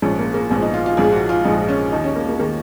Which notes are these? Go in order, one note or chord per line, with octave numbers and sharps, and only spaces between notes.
A#1 G#2 F3 C#4
A#3
A#3
A#1 G#2 F3 B3
D#4
F4
F4
A#1 G#2 F3 G#4
F#4
F4
A#1 G#2 F3 D#4
C#4
D#2 D#3 D#4
C#4
A#3
A#3
D#3 A#3